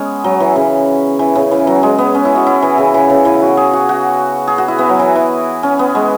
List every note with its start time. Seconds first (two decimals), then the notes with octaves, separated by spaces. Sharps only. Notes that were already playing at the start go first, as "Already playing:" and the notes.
Already playing: G#3 B3 C#4
0.24 F#3
0.40 E3
0.56 C#3
1.19 E3
1.35 C#3
1.51 E3
1.67 F#3
1.83 G#3
1.98 B3
2.15 C#4
2.25 E4
2.36 F#4
2.47 E4
2.62 E3
2.78 C#3
2.94 E3
3.10 C#3
3.25 E3
3.42 F#4
3.57 G#4
3.73 F#4
3.89 F#4
4.47 G#4
4.58 F#4
4.68 E4
4.79 B3
4.89 F#3
4.99 E3
5.16 E3
5.63 C#4
5.79 B3
5.95 G#3